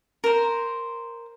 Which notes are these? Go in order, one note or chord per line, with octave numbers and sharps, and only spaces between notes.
A#4 C5